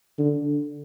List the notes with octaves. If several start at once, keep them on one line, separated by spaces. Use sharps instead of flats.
D3